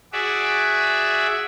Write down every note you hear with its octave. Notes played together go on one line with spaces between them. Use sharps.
F#4 G#4 D5 E5